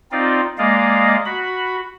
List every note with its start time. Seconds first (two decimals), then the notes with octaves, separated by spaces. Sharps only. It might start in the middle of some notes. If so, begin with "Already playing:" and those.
0.12 C4 D#4 F4 D5
0.58 G#3 A#3 D5 D#5 F5
1.26 F#4 B5